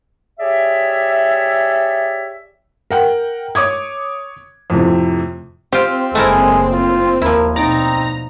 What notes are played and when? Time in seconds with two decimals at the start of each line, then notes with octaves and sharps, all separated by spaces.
0.39 G4 G#4 C#5 D5 E5
2.90 A#4 F#5 G5
3.55 C#5 D6 D#6 G#6
4.70 F2 A2 C3
5.72 C4 F4 G4
6.15 F#1 G#3 A3 E4 A#4
6.73 F4
7.22 D#2 F3 E4 A#4
7.56 B2 C4 D#4 D5 A#5